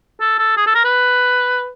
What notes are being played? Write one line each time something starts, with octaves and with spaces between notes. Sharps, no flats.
A4
A4
G#4
A4
A#4
B4